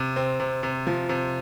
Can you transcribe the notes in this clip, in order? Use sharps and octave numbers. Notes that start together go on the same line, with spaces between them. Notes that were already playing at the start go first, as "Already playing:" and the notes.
Already playing: C3
C4
C3
C3
F3
C3